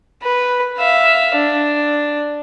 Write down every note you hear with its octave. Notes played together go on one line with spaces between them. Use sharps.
B4
E5 F5
D4